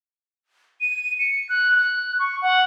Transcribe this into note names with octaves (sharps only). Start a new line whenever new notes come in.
D#7
C#7
F#6
F#6
C#6
F#5